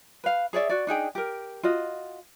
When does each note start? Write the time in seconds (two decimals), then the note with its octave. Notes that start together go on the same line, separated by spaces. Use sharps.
0.24 B4 F5
0.53 G#4 C#5 D5 E5
0.69 F#4 D5
0.87 D4 D#4 G#4 G5
1.15 G4 A#4
1.63 F4 F#4 D#5